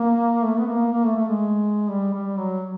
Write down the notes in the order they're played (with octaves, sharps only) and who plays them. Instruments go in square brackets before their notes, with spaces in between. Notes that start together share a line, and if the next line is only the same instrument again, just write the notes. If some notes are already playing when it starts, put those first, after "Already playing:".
Already playing: [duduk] A#3
A3
B3
A#3
A#3
A3
A3
G#3
G3
G3
F#3